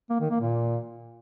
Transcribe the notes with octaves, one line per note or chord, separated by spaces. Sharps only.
A#3
D#3
A#3
A#2